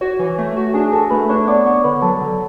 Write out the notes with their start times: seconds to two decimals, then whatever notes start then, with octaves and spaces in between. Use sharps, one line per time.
0.01 F#4 C#5
0.19 E3
0.38 A3
0.56 F#4
0.74 D4 G#4 G#5
0.92 F#4 A4 A5
1.10 A3 B4 B5
1.29 D4 C#5 C#6
1.47 B3 D5 D6
1.66 B3 C#5 C#6
1.84 D3 B4 B5
2.02 F#3 A4 A5
2.20 D3